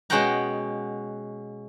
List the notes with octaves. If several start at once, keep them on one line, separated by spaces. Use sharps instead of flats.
B2 G#3 C#4 F#5 G5 A#5